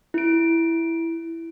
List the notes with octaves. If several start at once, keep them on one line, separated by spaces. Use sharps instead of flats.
E4 D7